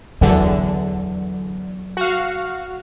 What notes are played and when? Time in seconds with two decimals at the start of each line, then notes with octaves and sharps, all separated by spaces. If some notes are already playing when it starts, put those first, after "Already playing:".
0.21 E2 D3 F#3
1.97 F#4 F5